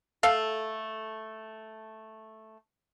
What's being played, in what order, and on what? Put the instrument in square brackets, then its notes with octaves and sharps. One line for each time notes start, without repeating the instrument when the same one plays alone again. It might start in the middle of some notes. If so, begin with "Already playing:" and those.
[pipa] A3 A4 F5